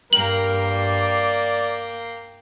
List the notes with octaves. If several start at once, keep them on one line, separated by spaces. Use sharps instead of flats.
G2 A#3 A#4 G5 F#7
D5